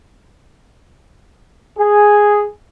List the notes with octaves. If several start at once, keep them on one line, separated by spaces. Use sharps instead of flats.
G#4